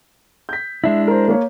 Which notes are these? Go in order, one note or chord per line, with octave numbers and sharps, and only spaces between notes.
G6 B6
G#3 D4 E4 E5
A#4 C5
A#3 A#4 C#5